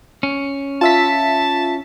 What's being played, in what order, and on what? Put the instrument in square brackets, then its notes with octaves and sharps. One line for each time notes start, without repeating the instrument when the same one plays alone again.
[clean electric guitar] C#4
[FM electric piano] F4 E5 B6 [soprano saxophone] A5